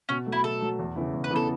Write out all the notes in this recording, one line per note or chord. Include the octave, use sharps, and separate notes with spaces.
B2 C#4
F#3 A3
E4
B2 A4
F#3 A3
E2
C#3 E3 B3 E4
E2
B4
C#3 E3 B3 E4
A4